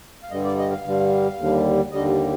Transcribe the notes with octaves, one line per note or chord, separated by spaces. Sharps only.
F5
G2 D3 G3 D#5
D5
D#5
F5
G2 D3 G3
D#2 D3 G3
D#2 D3 G3 D#5